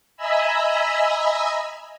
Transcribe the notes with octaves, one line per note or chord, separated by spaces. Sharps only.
D#5 E5 G#5 A#5 B5 E6